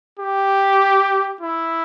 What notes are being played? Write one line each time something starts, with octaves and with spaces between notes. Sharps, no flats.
G4
E4